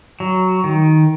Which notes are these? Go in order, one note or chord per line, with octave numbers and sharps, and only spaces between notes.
F#3
D#3